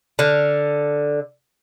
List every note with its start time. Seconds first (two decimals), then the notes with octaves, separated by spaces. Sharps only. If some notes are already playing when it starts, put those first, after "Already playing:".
0.19 D3 F5